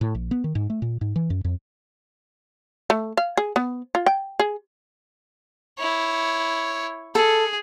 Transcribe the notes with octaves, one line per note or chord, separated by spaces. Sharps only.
A2
A#1
B3
D#3
G#2
A3
A#2
G#2
E3
F#2
F2
A3
F5
G#4
B3
F4
G5
G#4
E4 C#5
G#4 A4